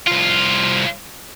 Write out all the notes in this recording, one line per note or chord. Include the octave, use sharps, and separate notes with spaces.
C2 F4